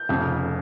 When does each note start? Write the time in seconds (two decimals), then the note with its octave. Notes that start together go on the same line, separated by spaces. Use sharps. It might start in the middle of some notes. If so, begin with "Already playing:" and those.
Already playing: G6
0.09 F1 F2 C#3